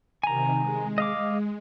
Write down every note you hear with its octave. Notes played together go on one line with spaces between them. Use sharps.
C3 D#3 G#5 A#5
G#3
D#5 F5 D6